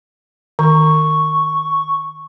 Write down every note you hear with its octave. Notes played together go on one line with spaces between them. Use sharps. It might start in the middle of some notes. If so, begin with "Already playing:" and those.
D#3 C#6